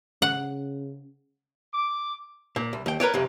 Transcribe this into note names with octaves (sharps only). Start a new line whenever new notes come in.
C#3 F#5
D6
A#2
C2
D#2 G5
A#4 B4 C#5 D5
C2 F2 C3